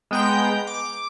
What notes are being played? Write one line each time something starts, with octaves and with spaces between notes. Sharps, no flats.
G#3 B3 G5 A#5 G6
D6